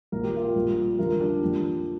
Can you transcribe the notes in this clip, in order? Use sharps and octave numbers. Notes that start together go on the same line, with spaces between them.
A#1 A#2 A#3 A#4
G4
F4 A#4
A#1 A#2 G3 A#3
F2 D3 G3 F4 A#4
D4 G4
F2 F3 A#3